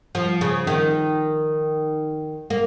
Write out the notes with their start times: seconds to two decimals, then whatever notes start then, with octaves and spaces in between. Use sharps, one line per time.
0.15 F3
0.41 C#3
0.67 D#3
2.50 A#3